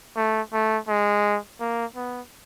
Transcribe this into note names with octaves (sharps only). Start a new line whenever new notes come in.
A3
A3
G#3
A#3
B3